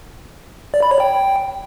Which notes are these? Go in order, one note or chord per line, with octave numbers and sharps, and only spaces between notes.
D5
B5
C#5
G5